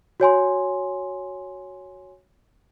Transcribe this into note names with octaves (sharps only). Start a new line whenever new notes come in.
F#4 C#5 G#5 C6